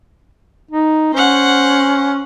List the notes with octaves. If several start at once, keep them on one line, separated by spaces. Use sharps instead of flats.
D#4
C#4 C5 F#5